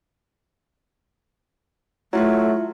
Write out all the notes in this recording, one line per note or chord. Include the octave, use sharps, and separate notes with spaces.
F#3 A3 E4 F4 B4